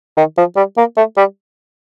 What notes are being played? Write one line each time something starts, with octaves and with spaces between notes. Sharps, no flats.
D#3
F3
G3
A#3
A3
G3